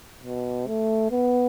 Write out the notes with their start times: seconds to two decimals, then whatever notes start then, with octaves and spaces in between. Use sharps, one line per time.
0.23 B2
0.67 A3
1.11 B3